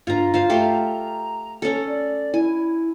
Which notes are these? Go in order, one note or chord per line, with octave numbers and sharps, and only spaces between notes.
G2 F4 A#5
F4 C5 F5
A3 G4 A#5 C6
C#4 A4
D5
E4 G#5